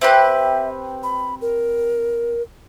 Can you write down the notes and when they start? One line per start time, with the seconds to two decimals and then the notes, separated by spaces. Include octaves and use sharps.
0.01 C4 G4 B4 E5
1.03 B5
1.42 A#4